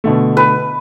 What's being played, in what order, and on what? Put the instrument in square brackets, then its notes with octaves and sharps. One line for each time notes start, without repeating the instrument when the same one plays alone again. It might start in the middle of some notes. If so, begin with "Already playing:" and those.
[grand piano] B2 D3 A3
[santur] B4